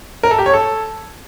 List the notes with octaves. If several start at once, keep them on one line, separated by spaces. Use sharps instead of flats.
A#4
A4
G4
C#5
A4